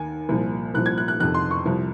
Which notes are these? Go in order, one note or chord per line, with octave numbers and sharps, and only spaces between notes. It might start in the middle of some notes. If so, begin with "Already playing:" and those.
Already playing: D#2 D#3 G#5
C2 A#2 F3
C2 A#2 F3 F#6
G#6
F#6
F#6
F2 C3 D#3 F#6
C6
C#6
C2 C3 F3